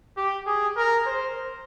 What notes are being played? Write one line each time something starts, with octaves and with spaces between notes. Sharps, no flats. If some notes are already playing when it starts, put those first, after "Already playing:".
G4
G#4
A#4
C5